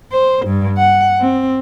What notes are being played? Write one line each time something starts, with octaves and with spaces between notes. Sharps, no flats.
C5
G2
F#5
C4